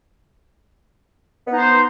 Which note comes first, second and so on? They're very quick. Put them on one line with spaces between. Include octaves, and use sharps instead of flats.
B3 D#4 C5